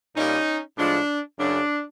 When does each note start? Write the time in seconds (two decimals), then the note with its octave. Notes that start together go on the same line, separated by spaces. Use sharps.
0.16 A#2 G3 A#3 C#4 D#4
0.77 A2 F3 G#3 D4
1.38 F#2 C#3 F#3 D4